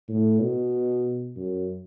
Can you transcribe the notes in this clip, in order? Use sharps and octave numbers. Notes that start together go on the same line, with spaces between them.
A2
B2
F#2